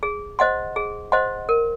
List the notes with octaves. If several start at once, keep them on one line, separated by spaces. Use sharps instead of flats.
G#4
C5 D#5 F#5 C6
G#4
C5 D#5 F#5 C6
A#4